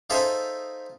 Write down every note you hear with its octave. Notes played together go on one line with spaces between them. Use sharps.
D#4 F4 G#4 A4 C5 E5